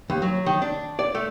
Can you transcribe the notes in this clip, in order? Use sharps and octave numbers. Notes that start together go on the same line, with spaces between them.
D#2
F#3
D#3
D4
D5
A3